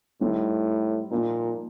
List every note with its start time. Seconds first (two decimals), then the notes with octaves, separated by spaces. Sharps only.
0.21 A2 D#3 G3 C4
1.11 A#2 F3 A#3 D#4